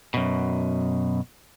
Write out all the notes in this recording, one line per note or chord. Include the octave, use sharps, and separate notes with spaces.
F#2 B2